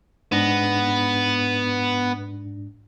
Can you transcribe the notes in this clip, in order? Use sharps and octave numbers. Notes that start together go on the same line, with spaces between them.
G#2 B3 D4 A#6